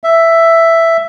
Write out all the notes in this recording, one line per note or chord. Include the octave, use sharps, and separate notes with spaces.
E5